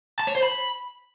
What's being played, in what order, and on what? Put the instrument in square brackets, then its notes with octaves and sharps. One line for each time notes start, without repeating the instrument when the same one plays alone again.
[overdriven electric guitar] A5
C#5
C5
B5